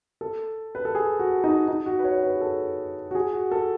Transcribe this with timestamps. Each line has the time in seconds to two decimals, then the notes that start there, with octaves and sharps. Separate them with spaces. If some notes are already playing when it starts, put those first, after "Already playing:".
0.21 A4
0.75 B4
0.85 A4
0.95 G#4
1.19 F#4
1.44 D#4
1.68 D#4
1.86 F#4
1.99 B4
2.04 C#5
2.15 C#5
2.23 B4
2.35 G#4
2.41 A4
3.11 F#4
3.15 G#4
3.33 F#4
3.51 A4